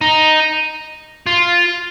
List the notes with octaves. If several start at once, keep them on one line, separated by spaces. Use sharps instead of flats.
D#4
F4